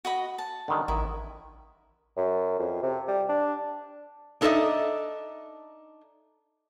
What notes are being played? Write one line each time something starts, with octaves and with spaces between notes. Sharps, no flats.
F#4 D#5 B5
A5
D3 D#3 G3
A1 D#3 E4 D#5
F#2
F2
C3
G3
D4
D4 D#4 A4 A#4 D#5 E5